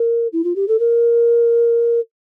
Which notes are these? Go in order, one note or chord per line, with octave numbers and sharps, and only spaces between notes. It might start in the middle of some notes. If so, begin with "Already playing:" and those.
Already playing: A#4
E4
F4
G4
A4
A#4